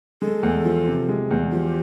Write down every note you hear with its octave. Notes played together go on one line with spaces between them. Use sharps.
G#3 A4
E2
F3
C3
G#3
E2
F3 G4